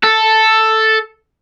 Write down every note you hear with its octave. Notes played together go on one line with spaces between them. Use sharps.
A4